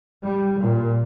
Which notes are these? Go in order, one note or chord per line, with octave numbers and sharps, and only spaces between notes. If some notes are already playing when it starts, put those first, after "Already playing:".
G3
A#2